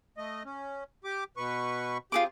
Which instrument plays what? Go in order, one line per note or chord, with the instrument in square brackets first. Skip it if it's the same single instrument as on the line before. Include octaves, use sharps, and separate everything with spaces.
[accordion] A3 D#5
C#4
G4 D6
B2 B4 C#6
[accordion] C3 G4 [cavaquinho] F4 G#4 D6